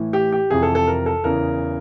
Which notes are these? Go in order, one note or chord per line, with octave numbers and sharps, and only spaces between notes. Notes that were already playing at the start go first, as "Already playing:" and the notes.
Already playing: A2 E3
G4
G4
F2 C3 E3 G#4
A4
A4
A#4
A4
E2 C#3 E3 A#4